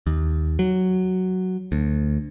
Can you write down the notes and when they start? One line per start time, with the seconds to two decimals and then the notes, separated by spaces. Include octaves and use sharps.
0.07 D#2
0.59 F#3
1.72 D2